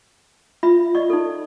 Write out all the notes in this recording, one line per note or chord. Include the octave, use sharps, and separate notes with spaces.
F4 E5 B5
D5 D#5 C#6
D#4 A4